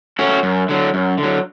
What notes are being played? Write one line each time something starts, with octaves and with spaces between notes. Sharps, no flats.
A3 C#4 F#4
F#2
D3 F#3
F#2
D3
F#3